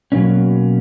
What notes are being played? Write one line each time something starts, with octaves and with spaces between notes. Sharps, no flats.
B2 F#3 A#3 C#4